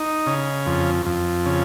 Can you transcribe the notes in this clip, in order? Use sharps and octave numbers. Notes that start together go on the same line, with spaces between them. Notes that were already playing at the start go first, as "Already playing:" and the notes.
Already playing: D#4
C#3
F2
F2
C#3